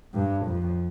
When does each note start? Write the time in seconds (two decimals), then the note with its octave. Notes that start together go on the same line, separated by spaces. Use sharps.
0.14 G2
0.46 F2